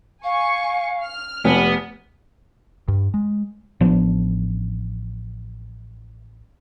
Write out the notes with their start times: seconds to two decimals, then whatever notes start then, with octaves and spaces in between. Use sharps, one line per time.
0.24 F5 G#5 C#6
1.04 F6
1.45 F1 B3 G4
2.88 G2
3.14 G#3
3.81 A1 F3 B3 D4